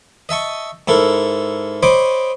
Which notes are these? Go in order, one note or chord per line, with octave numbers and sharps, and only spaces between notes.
D#5 E5 A5 C#6
G#2 E4 A4 A#4
C5 C#5 D#5 B5 D6